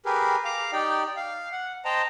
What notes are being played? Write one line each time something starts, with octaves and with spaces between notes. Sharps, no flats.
G4 G#4 A#4 B4
F5 A#5 D6
D#4 G4 D5 G5
F5
F#5
C5 D#5 G5 A5 A#5